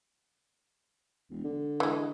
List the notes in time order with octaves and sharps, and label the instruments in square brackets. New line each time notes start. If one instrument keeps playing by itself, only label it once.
[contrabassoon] E1
D3
[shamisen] E3 G#3